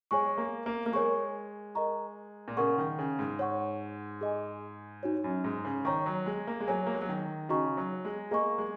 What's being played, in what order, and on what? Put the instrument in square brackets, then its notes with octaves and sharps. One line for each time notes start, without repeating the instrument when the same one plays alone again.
[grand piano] G#3 [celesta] C#5 G#5 C#6
[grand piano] A#3
A#3
A#3
[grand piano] G#3 [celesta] A#4 C#5 G#5 C#6
[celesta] A#4 D#5 A#5 C#6
[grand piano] A#2
[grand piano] C#3 [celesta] A#4 F#5 C#6
[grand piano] D#3
C#3
G#2
[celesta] C#5 F#5 C#6
G#4 D#5 G#5
D#4 F#4 C#5
[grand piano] F#2
G#2
C#3
[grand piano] D#3 [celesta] C#5 A#5 C#6
[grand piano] F#3
G#3
A#3
G#3
[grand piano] F#3 [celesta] G#4 C#5 G#5
[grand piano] A#3
G#3
F#3
D#3
[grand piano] C#3 [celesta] D#4 F#4 D#5 A#5 C#6
[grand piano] F#3
G#3
[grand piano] A#3 [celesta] G#4 D#5 G#5 C#6
[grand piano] G#3